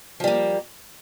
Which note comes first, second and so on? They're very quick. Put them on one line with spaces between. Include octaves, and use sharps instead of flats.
F3 G3 A#3